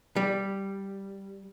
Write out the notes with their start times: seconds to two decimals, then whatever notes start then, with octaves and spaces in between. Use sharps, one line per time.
0.16 G3